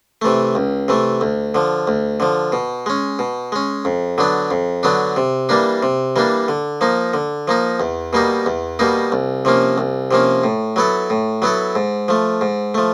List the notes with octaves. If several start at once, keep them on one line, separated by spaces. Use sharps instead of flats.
C3 E3 A3
C#2
C3 E3 A3
D2
D3 F3
D2
D3 F3
B2
G#3 C#4
B2
G#3 C#4
F2
D3 F#3 B3 D4
F2
D3 F#3 B3 D4
C3
E3 G3 A#3 D4
C3
E3 G3 A#3 D4
D3
F3 A#3 D#4
D3
F3 A#3 D#4
E2
B2 G3 A#3 D#4
E2
B2 G3 A#3 D#4
C2
C3 F3 A#3 C#4
C2
C3 F3 A#3 C#4
A2
F#3 B3 E4 A4
A2
F#3 B3 E4 A4
G#2
F3 A3
G#2
F3 A3